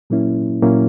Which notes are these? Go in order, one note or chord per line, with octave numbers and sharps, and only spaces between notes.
A#2 F#3 A#3 C#4 E4
A#2 F#3 A#3 C#4 E4